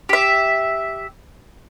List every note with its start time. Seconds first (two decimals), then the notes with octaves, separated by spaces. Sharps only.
0.09 G4 E5